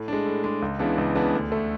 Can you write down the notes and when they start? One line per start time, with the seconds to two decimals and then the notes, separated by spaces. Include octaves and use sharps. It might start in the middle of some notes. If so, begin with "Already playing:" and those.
Already playing: A2
0.08 G#3 D4
0.26 A2
0.44 G#3 D4
0.62 C#2
0.79 C#3 E3 B3 D4
0.98 C#2
1.15 C#3 E3 B3 D4
1.33 D2
1.50 D3 A3